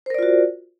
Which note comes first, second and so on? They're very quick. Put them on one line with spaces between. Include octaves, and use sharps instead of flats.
C5 A#4 D5 F4 F#4